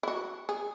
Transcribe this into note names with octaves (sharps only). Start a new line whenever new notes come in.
E4
F#4
G#4